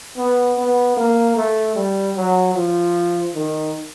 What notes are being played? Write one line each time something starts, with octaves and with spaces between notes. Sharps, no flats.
B3
B3
A#3
A3
G3
F#3
F3
D#3